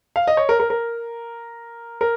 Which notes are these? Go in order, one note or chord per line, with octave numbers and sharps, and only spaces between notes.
F5
D#5
C#5
A#4
A#4
A#4
A#4